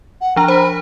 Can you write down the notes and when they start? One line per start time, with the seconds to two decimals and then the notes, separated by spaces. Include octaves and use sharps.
0.21 F#5
0.36 F3 D4 A#5
0.48 C5 B5